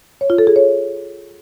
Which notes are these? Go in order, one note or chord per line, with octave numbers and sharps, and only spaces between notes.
C#5
F4
A4
G#4
C#5